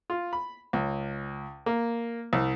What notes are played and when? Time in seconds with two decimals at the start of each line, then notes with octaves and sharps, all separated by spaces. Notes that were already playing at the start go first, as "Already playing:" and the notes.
0.10 F4
0.33 B5
0.73 C#2
1.66 A#3
2.33 C2